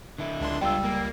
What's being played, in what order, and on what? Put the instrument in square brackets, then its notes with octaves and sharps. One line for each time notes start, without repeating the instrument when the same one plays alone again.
[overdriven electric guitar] D3 E4
[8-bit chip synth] C#2 D4 C6
[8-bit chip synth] C#2 G3 [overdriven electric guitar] D4 F4 [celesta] G5 E6
[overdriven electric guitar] A#3